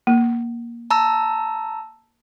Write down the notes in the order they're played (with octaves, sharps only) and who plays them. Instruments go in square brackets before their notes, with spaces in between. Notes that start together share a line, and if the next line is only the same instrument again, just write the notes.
[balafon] A#3
[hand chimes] A5 A#5 E6